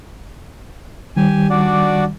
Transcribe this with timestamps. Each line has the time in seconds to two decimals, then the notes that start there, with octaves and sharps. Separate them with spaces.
1.16 D#3 G3 G4 G#5
1.50 D4 F#4 D5